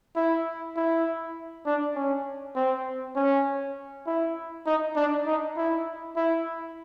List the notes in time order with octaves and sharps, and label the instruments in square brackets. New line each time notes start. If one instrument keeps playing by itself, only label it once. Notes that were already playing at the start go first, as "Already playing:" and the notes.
[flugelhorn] E4
E4
D4
C#4
C4
C#4
E4
D#4
D4
D#4
E4
E4